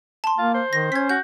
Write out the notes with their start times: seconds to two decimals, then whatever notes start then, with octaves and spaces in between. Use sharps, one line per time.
0.24 A5 C6
0.38 A#3 F4
0.54 C5
0.73 D#3 A#6
0.92 C#4 G#6 B6
1.09 F#4 G6